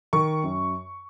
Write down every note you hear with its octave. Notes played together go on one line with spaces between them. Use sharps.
D#3 C#6
F#2